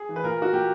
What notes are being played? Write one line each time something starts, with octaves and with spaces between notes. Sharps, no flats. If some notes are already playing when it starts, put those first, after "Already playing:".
Already playing: G#4
E3
B4
A#2 A#4
F#4
A#2 G4